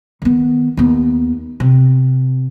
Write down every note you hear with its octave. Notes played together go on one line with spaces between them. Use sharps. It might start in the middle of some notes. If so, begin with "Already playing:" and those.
D#3 B3
D#2 B3
C3